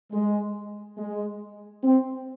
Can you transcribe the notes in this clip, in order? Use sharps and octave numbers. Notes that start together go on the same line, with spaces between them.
G#3
G#3
C4